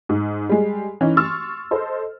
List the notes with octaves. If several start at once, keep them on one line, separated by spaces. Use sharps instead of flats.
G#2
G3 G#3
E3 C#4 D#4
C6 C#6 E6 F6 A6
A4 C5 D#5